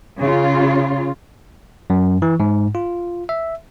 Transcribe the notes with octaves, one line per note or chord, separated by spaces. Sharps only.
C#3 F4
F#2
E3
G#2
F4
E5